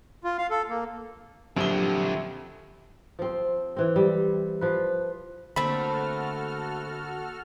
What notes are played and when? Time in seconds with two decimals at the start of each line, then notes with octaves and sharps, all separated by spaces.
0.24 F4
0.38 F5
0.50 A4
0.69 A#3
1.57 A#1 D3 F3 F#3 C4 G4 G7
3.19 F3 C4
3.77 E3 C4
3.96 G3
4.61 F3 B4
5.56 D3 A3 A#3 C4 F#4 A4 B5 F6